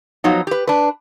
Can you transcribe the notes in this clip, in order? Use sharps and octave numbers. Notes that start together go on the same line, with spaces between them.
F3 F#3 B3 D#4
G4 B4
D4 B4